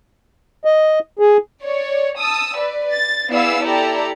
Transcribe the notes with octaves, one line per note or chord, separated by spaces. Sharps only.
D#5
G#4
C#5 D5
A5 D#6 E6
B4 D5
A6
B3 E4 G#4 D5 F5 E6
E4 G4 A4 D5 A#5